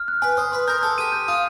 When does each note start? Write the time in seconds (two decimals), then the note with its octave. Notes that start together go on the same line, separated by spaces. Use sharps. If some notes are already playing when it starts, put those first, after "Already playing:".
Already playing: F6
0.08 F#6
0.22 B4 G#5
0.37 C5 D#6
0.52 B4 C6
0.68 A#4 G6
0.82 A4 G6
0.98 G4 D#7
1.12 G6
1.28 F4 D#6